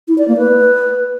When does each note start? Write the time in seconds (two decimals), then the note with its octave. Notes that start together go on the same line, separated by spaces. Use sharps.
0.08 E4
0.18 D5
0.28 A#3
0.38 B4